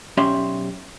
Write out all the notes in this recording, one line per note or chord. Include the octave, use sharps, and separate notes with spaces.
B1 C#4 G4 D5 E5 C6